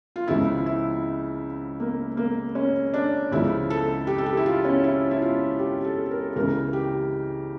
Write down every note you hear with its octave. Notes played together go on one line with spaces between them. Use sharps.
F4
C#2 C#3 F3 E4
E4
A#3
A#3
C#4
D4
C#2 C#3 F3 E4
A4
G4
A4
G4
E4
F4
C#4
E4
E4
F4
G4
A4
A#4
C#2 C#3 E3 A#4
G4